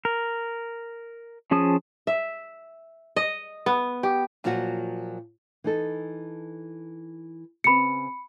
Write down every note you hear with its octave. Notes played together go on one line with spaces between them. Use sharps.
A#4
F3 C#4 G#4 A5 D#6
E5
D#5
B3
G4
A#2 F3 F#3 F4 F#4
E3 D#4 A4
C#3 C4 B4 B5 C#7